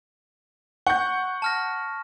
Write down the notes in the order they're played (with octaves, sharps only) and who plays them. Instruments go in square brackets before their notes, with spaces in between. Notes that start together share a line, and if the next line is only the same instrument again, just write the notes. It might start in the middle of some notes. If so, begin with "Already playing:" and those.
[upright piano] F#5 G6 [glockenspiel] C#6
[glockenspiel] A5 F6 A#6